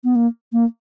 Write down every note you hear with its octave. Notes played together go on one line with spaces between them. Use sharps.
B3
A#3
A#3